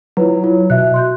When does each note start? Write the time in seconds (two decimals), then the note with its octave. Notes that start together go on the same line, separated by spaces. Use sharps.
0.17 F#3 E4 F4 B4
0.44 E4 F4
0.70 B2 E5 F#6
0.94 C6 F#6 G6